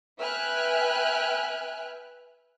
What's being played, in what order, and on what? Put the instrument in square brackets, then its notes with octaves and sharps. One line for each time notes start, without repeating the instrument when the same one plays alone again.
[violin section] B4 E5 G5 G#5 F6 F#6